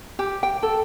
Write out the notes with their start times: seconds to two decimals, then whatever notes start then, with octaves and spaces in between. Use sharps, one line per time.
0.19 G4
0.43 G5
0.63 A4